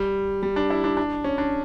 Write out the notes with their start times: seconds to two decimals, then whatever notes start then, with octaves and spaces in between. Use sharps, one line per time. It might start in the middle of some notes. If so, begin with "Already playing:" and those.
Already playing: G3
0.43 G3
0.56 D4
0.70 E4
0.84 D4
0.97 D4
1.24 C#4
1.38 D4